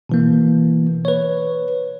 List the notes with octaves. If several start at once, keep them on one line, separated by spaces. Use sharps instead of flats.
B2 E3 A#3
B4 C#5